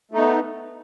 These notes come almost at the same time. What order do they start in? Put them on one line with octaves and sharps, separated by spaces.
A3 D#4 B3